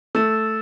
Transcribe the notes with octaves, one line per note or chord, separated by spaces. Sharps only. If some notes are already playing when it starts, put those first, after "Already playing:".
A3 E6 A6 E7